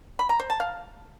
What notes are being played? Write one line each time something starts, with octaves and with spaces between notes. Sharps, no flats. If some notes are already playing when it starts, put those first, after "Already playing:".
B5
A#5
C5
A5
F5